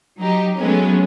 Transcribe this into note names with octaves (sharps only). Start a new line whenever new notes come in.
F#3 D#4 G4
F#3 G#3 A3 B3 C#4